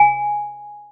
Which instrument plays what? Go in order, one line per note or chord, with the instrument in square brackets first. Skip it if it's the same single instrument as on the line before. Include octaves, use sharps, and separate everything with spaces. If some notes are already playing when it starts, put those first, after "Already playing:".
Already playing: [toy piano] G#5